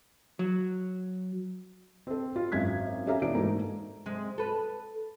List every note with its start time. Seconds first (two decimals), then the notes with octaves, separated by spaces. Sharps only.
0.39 F#3
2.07 C4 A4
2.36 F4
2.52 G#1 F#2 G#6 B6
3.07 C#4 G4 A4 E5 F5 A#5
3.22 B2 E3 D4 D7
3.35 G#2 A3 A#3 D#4
4.06 C3 G#3
4.38 A4 B4